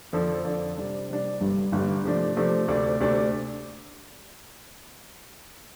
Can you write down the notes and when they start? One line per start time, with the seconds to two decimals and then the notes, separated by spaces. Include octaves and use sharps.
0.13 F2 D3 F3 D4 A4
0.45 F2 D3 F3 D4 A4
0.77 C3 G3 D4
1.08 C3 G3 D4
1.41 G1 G2 D3 G3
1.72 G1 G2 D3 G3
2.04 C3 F3 A3 D4
2.36 C3 F3 A3 D4
2.68 D2 C3 A3 D4
3.00 D2 C3 A3 D4